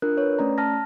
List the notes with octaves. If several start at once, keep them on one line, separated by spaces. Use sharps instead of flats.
D4 F4 A#4 F#6
B4 C#5
A3 C#4 D5 A#5
A5 F6 A#6